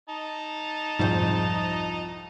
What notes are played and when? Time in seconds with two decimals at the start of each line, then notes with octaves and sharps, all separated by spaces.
0.09 D#4 A5
0.99 C2 F2 G#2 F3 C5